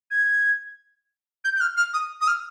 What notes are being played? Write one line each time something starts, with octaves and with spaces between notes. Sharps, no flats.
G#6
G6
G6
F6
F6
D#6
D#6
F6